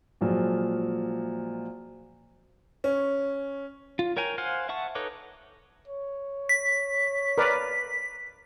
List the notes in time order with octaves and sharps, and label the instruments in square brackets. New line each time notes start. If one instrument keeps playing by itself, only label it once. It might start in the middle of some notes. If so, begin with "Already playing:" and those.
[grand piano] A#2 F3 F#3 G#3
[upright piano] C#4
[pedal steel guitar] F4
A#4 C#5 G5 G#5 A#5
C5 F5 F#5 G#5 F6
E5 F#5 A5 C#6
D#4 A4 B4 C#5 D6
[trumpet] C#5
[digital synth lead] B6
[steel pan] A#4 B4 D5